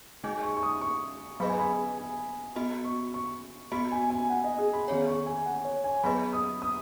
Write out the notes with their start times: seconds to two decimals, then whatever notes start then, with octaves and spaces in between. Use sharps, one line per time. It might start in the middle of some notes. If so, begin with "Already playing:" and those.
0.24 G#3 D#4 G#4 D#5 G#5
0.43 C#6
0.56 C#6
0.63 D#6
0.81 C#6
1.40 F#3 B3 G#4 B4 D#5 B5
1.49 G#5
1.59 B5
1.98 G#5
2.56 B3 F#4 D#5 B5
2.85 C#6
3.14 C#6
3.72 B3 F#4 D#5 B5
3.92 G#5
4.10 G#5
4.30 F#5
4.44 D#5
4.59 G#4
4.73 B5
4.88 D#3 B3 G#4 C#5 B5
5.08 C#6
5.26 G#5
5.46 F#5
5.65 C#5
5.84 G#5
6.04 F#3 B3 G#4 B4 D#5 B5
6.33 D#6
6.62 D#6